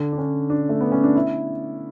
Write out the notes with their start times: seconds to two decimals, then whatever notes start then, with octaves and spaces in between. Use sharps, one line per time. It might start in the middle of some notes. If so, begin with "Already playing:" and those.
Already playing: D3
0.12 D4
0.18 C#4
0.50 D4
0.69 A3
0.81 B3
0.92 C#4
1.03 D4
1.15 E4